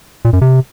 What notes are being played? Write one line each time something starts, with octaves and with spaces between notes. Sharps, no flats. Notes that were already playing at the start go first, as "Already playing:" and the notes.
A#2
F#2
C3